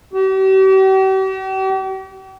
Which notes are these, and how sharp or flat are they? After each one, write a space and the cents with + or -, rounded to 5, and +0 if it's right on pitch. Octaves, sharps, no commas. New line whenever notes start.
G4 -45